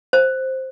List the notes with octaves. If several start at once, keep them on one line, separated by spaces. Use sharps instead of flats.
C5